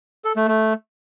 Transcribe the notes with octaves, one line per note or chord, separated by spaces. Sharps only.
A4
A3
A3